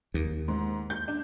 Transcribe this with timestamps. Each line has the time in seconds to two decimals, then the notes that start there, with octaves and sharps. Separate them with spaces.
0.14 D#2
0.48 G#2
0.90 G6
1.08 D4